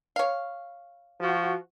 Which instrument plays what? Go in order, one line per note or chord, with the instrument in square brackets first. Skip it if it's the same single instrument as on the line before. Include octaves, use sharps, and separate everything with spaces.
[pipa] C#5 F5
[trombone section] F3 F#4